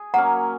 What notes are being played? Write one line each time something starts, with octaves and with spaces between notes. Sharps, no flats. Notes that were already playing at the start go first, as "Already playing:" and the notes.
Already playing: G#4
F#3 A#3 C#4 F#5 A#5